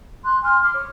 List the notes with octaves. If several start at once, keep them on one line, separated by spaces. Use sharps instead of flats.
C6 F#6
G#5 C6 F6
C6 D6 F6
C#5